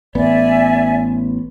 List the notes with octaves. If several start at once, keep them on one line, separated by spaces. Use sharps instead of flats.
A1 B3 D5 E5 G#5